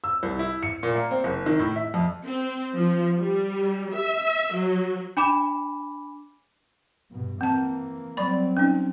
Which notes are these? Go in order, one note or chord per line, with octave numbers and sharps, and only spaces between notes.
E6
C2
E4
C#7
A#2
A#3
C4
F#1
D#3
A2
E5
F2
C4
F3
G3
E5
F#3
D4 G#5 B5 D6 E7
G2 B2
E3 A#3 C4 A5
F#3 G3 C4 D5 B5
C#4 D#4